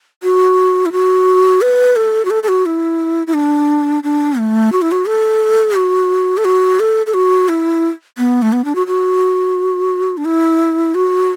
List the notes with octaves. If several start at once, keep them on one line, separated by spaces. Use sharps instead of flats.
F#4
E4
F#4
B4
A4
F#4
A4
A4
F#4
E4
E4
D4
D4
A3
F#4
E4
F#4
A4
F#4
A4
F#4
A4
A4
F#4
E4
B3
A3
B3
D4
F#4
F#4
D4
E4
F#4